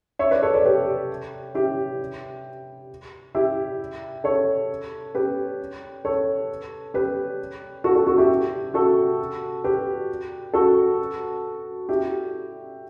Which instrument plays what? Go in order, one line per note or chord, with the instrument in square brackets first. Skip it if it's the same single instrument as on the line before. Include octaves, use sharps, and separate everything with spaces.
[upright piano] C#5 E5
B4 D5
A4 C#5
B4 D5
G4 B4
E4 G4
E4 G4
A4 C#5
G4 B4
A4 C#5
G4 B4
F#4 A4
F#4 A4
F#4 A4
E4 G4
F#4 A4
G4 B4
F#4 A4
E4 G4